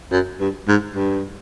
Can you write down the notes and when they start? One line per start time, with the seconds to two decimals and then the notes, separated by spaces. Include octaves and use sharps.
0.11 F#2
0.40 G2
0.68 G#2
0.96 G2